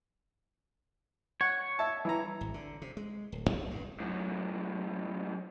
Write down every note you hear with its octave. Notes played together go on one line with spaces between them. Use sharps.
C#5 F#5
E5 A5
E3 E4 A#5
G#1
D3
C3
G#3
D1
C2
G2
F#2 A2